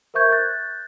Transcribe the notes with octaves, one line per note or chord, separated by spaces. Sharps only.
A#4 C5 E5 C#6 G6 G#6
F#6 G6 A6